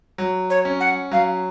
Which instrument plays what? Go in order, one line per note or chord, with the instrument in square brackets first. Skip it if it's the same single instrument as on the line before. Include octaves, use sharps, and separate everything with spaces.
[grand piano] F#3
[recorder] C#5
[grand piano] C#4
[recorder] F#5
[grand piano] F#3 [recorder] F5